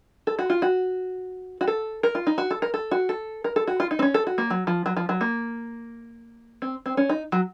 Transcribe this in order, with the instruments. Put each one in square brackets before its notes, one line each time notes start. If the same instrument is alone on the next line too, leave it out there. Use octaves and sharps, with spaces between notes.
[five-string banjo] A4
F#4
F4
F#4
F#4
A4
A#4
F4
D#4
F#4
A4
A#4
A4
F#4
A4
A#4
A4
F#4
F4
D#4
C4
C#4
A4
F#4
A#3
F#3
F3
F#3
F3
F#3
A#3
C4
C4
C#4
D#4
F#3